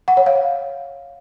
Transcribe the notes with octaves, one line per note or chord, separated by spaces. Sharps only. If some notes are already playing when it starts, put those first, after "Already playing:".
F#5
C#5
F5